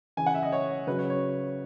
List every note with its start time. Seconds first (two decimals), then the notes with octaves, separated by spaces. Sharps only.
0.17 C#3 E3 G#5
0.26 F#5
0.34 E5
0.43 D#5
0.52 C#5
0.87 C#3 F#3 B4
0.98 C#5
1.10 C#5